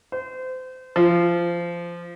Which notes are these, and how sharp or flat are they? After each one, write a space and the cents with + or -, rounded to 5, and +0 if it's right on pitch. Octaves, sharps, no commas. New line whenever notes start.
C5 -30
F3 -20